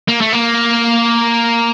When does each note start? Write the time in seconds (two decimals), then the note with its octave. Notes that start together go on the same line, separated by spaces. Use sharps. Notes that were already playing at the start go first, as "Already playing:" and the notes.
0.08 A#3
0.21 A3
0.33 A#3